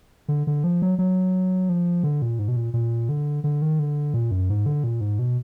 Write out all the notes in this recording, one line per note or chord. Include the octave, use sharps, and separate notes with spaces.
D3
D3
F3
F#3
F#3
F3
D3
A#2
G#2
B2
A#2
A#2
D3
D3
D#3
D3
A#2
F#2
G#2
D3
A#2
G#2
B2